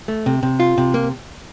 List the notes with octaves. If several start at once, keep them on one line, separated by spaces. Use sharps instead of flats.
A3
C3
C3
F4
C3
A#3